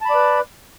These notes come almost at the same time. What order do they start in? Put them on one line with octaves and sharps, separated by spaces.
A5 B5 D5 B4